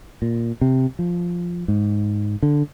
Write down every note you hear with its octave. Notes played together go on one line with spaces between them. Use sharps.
A#2
C3
F3
G#2
D3